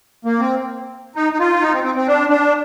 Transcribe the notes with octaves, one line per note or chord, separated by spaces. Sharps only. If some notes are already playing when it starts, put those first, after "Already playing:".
A#3
C4
D#4
D#4
F4
D#4
C4
C4
C4
D4
D4